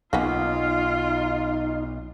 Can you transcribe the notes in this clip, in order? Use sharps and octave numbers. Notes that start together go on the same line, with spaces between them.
B1 A#3 B3 C#4 D#4 F4